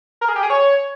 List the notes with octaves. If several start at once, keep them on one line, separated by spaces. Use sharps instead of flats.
A#4
G#4
G4
G#4
C#5